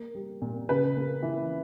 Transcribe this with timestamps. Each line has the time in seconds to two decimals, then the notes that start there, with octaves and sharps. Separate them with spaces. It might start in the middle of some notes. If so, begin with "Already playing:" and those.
Already playing: A#3
0.15 G3
0.42 A#2
0.69 C#3 B4
0.97 A#3
1.23 E3